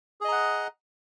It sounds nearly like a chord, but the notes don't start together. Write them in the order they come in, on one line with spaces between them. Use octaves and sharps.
G#4 D#5 A#5 F#5